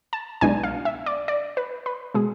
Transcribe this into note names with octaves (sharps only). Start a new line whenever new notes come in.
A5
B1 B2 G#3 D4 G#5
F5
E5
D5
D5
B4
B4
B2 G#3 G#4